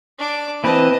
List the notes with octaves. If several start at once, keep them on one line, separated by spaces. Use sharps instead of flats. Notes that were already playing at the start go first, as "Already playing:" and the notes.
D4 D6
E3 C4 B4 D#5 A5